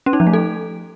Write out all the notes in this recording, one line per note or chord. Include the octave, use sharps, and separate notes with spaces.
C#4
D#4
F3
A3
A4